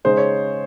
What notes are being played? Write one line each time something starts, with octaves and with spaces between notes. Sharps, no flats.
C#3 G#3 D#4 C5
C#5